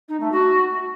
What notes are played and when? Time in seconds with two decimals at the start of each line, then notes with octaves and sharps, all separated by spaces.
0.08 D#4
0.20 A3
0.32 F#4